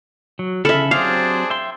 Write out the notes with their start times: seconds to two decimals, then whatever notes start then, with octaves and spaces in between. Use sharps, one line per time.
0.39 F#3
0.65 C#3 A4 E5 B5 F6
0.91 F#3 C4 D4 G4 G#4 C5 F5
1.50 E5 G5 C6